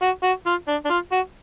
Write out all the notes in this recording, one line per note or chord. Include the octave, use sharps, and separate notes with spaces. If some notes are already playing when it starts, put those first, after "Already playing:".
F#4
F#4
F4
D4
D4
F4
F#4